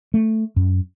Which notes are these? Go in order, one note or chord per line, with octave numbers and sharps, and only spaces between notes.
A3
F#2